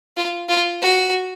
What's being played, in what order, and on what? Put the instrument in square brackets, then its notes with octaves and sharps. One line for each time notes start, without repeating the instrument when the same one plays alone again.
[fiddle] F4
F4
F#4